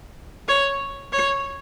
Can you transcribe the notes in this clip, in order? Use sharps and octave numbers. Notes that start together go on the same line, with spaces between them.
C#5
C#5